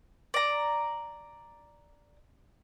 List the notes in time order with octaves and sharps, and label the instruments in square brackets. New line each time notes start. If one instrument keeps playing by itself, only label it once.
[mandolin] D5 A#5